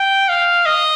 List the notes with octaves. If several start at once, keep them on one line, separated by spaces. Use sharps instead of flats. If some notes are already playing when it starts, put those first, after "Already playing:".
Already playing: G5
F5
D#5